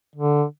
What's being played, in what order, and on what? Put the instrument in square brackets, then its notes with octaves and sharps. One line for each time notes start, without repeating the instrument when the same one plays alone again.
[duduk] D3